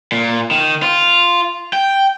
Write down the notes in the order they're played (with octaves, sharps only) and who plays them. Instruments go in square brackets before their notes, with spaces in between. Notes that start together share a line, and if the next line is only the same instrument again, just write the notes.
[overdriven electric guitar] A#2
D#3
F4
G5